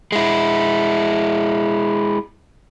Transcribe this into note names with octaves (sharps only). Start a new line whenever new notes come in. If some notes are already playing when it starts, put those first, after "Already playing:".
G#3 E4